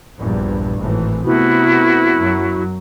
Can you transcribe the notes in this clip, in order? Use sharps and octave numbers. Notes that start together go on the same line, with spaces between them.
A#1 E2 G2
G#1 A2 E3
C3 A3 B3 E4 F#4
F#2 F#3